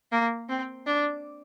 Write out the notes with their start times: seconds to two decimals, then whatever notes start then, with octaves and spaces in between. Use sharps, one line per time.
0.12 A#3
0.49 C4
0.87 D4